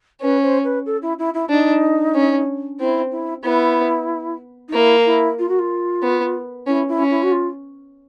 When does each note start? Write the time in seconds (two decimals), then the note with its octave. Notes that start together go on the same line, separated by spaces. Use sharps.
0.21 C#4 B4
0.42 C5
0.64 B4
0.86 A4
1.02 E4
1.18 E4
1.34 E4
1.50 D4 D#4
2.15 C#4
2.79 C4 E4
3.11 E4
3.44 B3 E4
4.68 D#4
4.73 A#3 E4
5.05 E4
5.38 F4
5.48 F#4
5.59 F4
6.03 B3
6.67 C#4 E4
6.88 E4
6.99 C#4
7.10 E4
7.23 F#4
7.31 F4